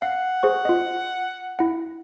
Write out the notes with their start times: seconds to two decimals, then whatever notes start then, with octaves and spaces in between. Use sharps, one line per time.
0.02 F5 F#5
0.43 G#4 C5 C#6
0.65 F4 D#5
1.59 E4 F#5